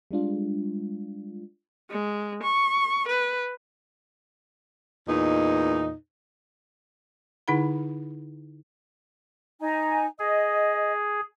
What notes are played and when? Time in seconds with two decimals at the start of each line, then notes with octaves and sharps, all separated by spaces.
0.11 G3 G#3 D4 F4
1.91 G#3
2.43 C#6
3.08 B4
5.09 E2 A#2 D#4
7.48 D3 D#4 E4 G#4 F#5 B5
9.61 D#4 G#5 A#5
10.19 G#4 D#5